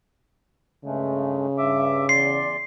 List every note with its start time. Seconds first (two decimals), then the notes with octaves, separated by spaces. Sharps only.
0.85 G2 C#3 G#3 A3
1.58 G2 E5 D6
2.09 E2 D5 C6 C7